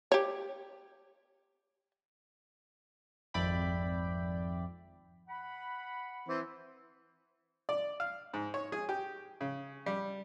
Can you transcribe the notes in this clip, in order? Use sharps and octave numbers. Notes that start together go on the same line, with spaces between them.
G4 C#5
G#1 F2 D5 E5 G5 B5
F#5 B5
E3 C4
D5
F5
G#2
C#5
G#4
G4
C#3
G3